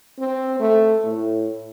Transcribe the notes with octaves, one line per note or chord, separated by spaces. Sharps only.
C4
A3
A2